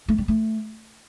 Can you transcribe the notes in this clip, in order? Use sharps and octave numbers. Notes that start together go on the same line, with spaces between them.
A3
G3
A3